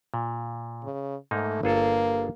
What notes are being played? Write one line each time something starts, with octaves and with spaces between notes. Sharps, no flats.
A#2
C#3
G#2 A3 A#3 D#4
G1 A#3 G#4 A4